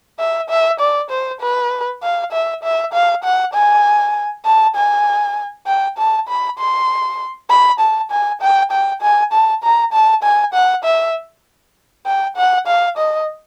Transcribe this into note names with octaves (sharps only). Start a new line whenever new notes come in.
E5
E5
D5
C5
B4
F5
E5
E5
F5
F#5
G#5
A5
G#5
G5
A5
B5
C6
B5
A5
G#5
G5
G5
G#5
A5
A#5
A5
G#5
F#5
E5
G5
F#5
F5
D#5